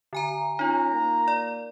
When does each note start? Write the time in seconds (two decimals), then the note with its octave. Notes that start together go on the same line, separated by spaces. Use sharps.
0.13 D3 G#5 A#5
0.59 C#4 D#4 F4 A#5
0.92 A#3
1.28 D5